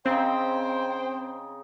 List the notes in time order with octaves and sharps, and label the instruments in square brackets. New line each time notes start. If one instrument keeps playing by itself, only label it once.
[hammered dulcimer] C#3 D#4 [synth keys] C4 [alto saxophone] C5 [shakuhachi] G5